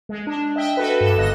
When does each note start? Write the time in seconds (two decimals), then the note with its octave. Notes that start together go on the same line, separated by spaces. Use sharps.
0.09 G#3
0.27 D4
0.56 D#5 E5 G5
0.77 F#4 A4 B4
1.01 G2 A4 E7
1.17 G1 G2 D#5 F#6 A#6